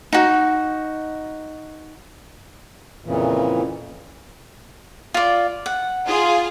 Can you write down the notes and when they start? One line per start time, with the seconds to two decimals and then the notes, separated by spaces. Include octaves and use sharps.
0.13 D#4 F#4
3.05 F2 A#2 C#3 E3
5.14 F4 D5
5.66 F#5
6.07 F4 G#4